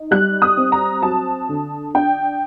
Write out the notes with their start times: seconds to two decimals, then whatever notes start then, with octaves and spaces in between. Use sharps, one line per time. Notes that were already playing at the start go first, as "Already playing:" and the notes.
Already playing: D#4
0.11 G3 F#6
0.42 D#6
0.57 C4
0.72 A#5
1.02 F#3 A5
1.49 D3
1.94 D4 G5